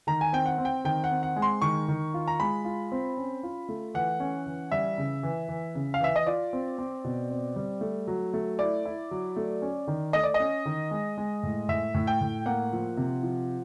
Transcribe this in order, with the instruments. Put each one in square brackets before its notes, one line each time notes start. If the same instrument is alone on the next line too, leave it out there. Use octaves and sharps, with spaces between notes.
[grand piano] D#3 A#5
G#5
C4 G5
F#5
C4
G5
D#3 G5
F#5
C4
F#5
G#3
C6
D#3 C#6
D#3
F4
A#5
G#3 B5
F4
C4
C#4
F4
A3
E3 F#5
C#4
E3
G3 E5
C#3
E3
E3
C#3
F5
E3 E5
D#5
F4 D5
C4
C4
B2
C4
G3
A3
F#3
A3
E4 D5
E4
F#3
A3
C#4
D#3
A3 D#5
D5
D#5
C#4
D#3
G#3
G#3
A2
A2 E5
A2
G5
A2
A#3 F#5
F3
C3
F3